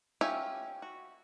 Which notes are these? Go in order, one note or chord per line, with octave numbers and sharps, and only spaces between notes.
C#4 F4 G4 E5 G#5
F#4